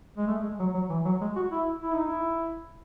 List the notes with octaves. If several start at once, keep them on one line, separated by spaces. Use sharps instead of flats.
G#3
A3
G#3
F#3
F#3
E3
F#3
G#3
F#4
E4
E4
D#4
E4